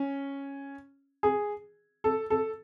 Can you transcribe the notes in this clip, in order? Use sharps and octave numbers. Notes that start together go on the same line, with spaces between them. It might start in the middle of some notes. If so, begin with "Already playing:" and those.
Already playing: C#4
G#4
A4
A4